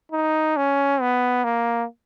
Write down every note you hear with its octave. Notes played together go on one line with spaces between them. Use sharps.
D#4
C#4
B3
A#3